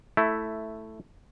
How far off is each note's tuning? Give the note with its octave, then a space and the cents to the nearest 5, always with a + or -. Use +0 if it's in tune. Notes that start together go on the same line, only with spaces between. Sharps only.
A3 +0 E4 +0